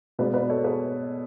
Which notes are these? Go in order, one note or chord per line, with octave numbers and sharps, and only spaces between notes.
B2 G#3 B3 B4 D5
B4 D5
A4 C#5
G#4 B4